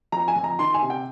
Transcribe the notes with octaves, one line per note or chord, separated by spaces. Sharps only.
F2 A#5
G#5
F2
A#5
D#3 C6
G#5
C3
G5